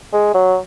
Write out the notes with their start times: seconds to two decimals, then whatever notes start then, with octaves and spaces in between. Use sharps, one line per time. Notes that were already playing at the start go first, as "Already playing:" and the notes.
0.13 G#3
0.34 F#3